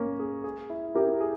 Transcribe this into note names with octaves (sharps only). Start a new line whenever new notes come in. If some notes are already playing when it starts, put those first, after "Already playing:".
Already playing: A#3 C#4
G#4
G#4
E4
E4 G4 A#4
G#4